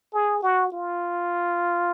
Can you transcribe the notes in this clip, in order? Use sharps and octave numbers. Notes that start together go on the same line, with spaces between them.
G#4
F#4
F4